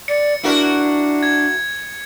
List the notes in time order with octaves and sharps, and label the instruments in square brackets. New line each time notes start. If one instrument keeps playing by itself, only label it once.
[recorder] D5 [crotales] C#7
[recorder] D4 [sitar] E4 F#4 A#4
[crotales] G#6